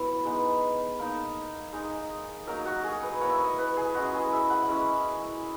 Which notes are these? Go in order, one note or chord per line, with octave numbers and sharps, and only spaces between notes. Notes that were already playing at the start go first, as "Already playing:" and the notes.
Already playing: F#3 B3 E4
G#3 B3 D#4
A#3 D#4
G#3 D#4
F#3 A#3 D#4 A#4
F#4
G#4
B4
A#3 E4 C#5
E5
D#5
B4
G#4
G#3 C#4 E4 F#4
G#4
E5
F#5
G#3 C#4 E4